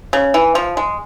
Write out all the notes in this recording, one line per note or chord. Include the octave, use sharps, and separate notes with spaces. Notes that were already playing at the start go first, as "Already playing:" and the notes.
C#3
E3
F3
G#3